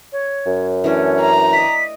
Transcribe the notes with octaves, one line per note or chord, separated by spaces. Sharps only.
C#5
F#2
E3 A3 C#4 D4
A#5
D5 D#5 B6